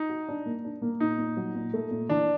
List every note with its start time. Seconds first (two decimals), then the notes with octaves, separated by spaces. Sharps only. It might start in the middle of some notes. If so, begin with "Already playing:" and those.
Already playing: D#4
0.09 F#4
0.28 D4
0.46 A#3
0.64 D4
0.82 A#3
1.00 A#2 D#4
1.18 A#2
1.37 F#3
1.55 A#2
1.74 A3
1.91 A#2
2.09 E3 D4